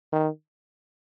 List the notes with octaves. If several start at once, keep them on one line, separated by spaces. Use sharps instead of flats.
D#3